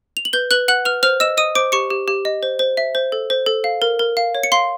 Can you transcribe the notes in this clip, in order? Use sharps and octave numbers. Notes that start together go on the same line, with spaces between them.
F7
F#7
B4 G6 G7
B4 F#6 F#7
F#5 F#6 F#7
B4 F6 F7
C5 F6 F7
D#5 E6 E7
D#5 D#6 D#7
C5 D6 D7
G4 C#6 C#7
G4
G4
D#5
C5
C5
E5
C5
A4
C5
A4
F5
A#4
A#4
F5
C#5
C#7
F5 C6 C7